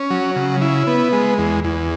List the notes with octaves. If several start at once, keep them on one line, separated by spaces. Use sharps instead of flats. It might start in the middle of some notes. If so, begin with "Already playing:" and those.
Already playing: C#4
F#3
C#3
E4
B3
G#3
E2
E2